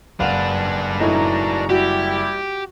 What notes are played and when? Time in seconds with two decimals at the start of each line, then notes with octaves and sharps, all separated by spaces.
0.20 F#1 D4 B4 F5 F#5 F7
1.00 A2 G#3 D#4 E4 F#4 A#5
1.69 G3 E4 F#4 G4